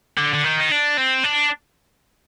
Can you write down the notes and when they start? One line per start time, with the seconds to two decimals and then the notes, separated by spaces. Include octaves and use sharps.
0.18 D3
0.34 D3
0.44 D#3
0.60 D#4
0.71 D4
0.97 C4
1.24 D4